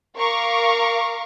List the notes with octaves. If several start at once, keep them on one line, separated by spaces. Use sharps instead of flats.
A#4 F5 A#5 C#6 D6